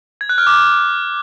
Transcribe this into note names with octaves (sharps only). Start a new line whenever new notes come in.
G#6
F#6
F6
D6